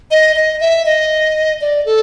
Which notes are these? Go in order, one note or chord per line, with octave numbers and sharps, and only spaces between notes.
D#5
D#5
E5
D#5
D5
A4